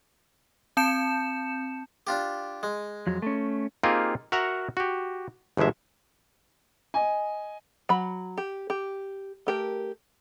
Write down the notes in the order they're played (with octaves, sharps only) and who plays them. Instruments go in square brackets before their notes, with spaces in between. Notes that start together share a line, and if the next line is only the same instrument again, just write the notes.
[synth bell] C4 A5 G6 C#7 E7
[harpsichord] D4 F4 G4
G#3
[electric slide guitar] F2 F#3
A3 C#4
[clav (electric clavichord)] A#3 C4 D#4 F4 G4 G#4
F#4 A#4 E5 F#5 A#5
F#4 G4
G1 E2 B2 G#3 E5
[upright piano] D#5 G#5
[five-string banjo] F#3 B5
G4
G4
A3 G4 A#4